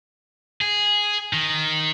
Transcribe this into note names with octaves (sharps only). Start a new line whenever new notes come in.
G#4
D#3